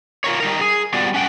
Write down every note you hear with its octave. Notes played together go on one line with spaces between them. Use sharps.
F4 A#4 C#5
G3 D#4 A#4
G#4
G3 B3 F4 F#4 D5
C#4 F#5 G5